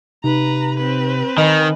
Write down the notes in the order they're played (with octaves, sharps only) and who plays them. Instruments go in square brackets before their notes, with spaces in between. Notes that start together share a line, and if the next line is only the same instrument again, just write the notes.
[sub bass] C3 [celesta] D#4 [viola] B4 A#5
[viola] C4 B4
[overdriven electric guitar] D#3 [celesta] D#5 G#5 B5